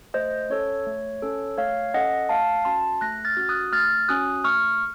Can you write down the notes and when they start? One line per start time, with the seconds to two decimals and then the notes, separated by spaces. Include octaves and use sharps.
0.14 A3 C5 D#5
0.50 C#4 A4 C#5
0.86 A3
1.22 C#4 A4
1.58 A3 C#5 F5
1.94 C#4 A4 D#5 F#5
2.29 A3 F5 A5
2.65 C#4 F#4 A5 C6
3.01 A3 F#6 A#6
3.25 F6 A6
3.37 C#4 F#4
3.49 D#6 F#6
3.73 A3 F6 A6
4.08 C#4 F#4 D#6 F#6
4.44 A3 C#6 F6